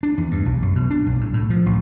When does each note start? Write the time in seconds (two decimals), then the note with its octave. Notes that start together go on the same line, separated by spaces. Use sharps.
0.03 D4
0.18 E2
0.31 G2
0.46 B1
0.62 F#2
0.76 B2
0.91 D4
1.06 B1
1.21 A2
1.34 A2
1.50 F3
1.66 A1